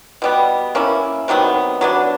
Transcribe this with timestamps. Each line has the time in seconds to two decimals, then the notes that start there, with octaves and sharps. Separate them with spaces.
0.22 B2 G3 B3
0.75 A#3 C#4 E4
1.28 C3 D#3 F#3 B3
1.81 F#3 B3 D4